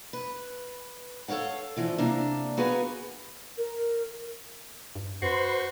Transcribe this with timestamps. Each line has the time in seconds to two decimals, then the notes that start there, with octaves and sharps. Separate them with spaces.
0.13 B4
1.28 A4 A#4 C#5 F5 F#5
1.76 D3 E3 F3
1.98 C3 A#3 D4
2.57 A#3 B3 F#4 G#4 B4
3.58 A#4
4.95 G2
5.22 F#2 F#4 B4 C5 C6